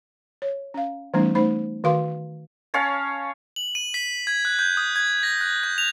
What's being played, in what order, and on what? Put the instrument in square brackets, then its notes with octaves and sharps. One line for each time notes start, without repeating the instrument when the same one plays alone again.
[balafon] C#5
C#4 F5
E3 G3 A3 B3 C#4 D#4
A3 D#4 C5 B5
D#3 F#4 A#4 F5 C6 D6
[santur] C#4 C#5 F5 A5
[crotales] F#7
D#7
B6
G#6
F#6
G6
D#6
G#6
A#6
F#6
G6
F7